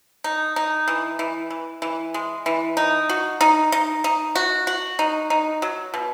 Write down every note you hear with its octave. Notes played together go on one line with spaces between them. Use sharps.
D#4
D#4
E3
E3
E3
E3
G#3
E3
D#4
F#4
D#4
D#4
D#4
F#4
F#4
D#4
D#4
F#3
B2